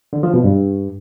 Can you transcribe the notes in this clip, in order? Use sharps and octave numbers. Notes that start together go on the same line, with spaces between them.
D3
F3
B2
G2